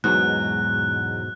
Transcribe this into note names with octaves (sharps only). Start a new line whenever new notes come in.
E2 G#2 B2 F#3 F#6